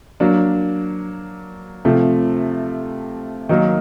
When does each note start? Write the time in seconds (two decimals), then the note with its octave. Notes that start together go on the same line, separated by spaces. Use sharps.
0.20 F#3 A#3 D4
1.85 C3 F3 A3
3.49 D#3 F#3 A#3